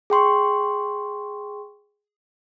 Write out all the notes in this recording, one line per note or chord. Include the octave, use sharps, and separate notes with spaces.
G#4 G5 C6 C#6